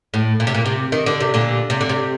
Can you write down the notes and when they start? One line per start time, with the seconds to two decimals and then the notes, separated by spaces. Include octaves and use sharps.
0.14 A2
0.40 A#2
0.47 C3
0.54 A#2
0.66 C3
0.92 D#3
1.06 D3
1.20 C3
1.34 A#2 D3
1.70 C3
1.81 D3
1.89 C3